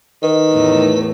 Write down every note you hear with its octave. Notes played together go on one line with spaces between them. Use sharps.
D#3 B4
E2 A2